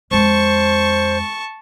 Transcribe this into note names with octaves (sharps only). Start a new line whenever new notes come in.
F2 G#3 C5 A5 C#6